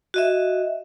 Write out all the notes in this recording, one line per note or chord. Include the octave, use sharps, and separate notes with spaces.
F#4 D#5 E5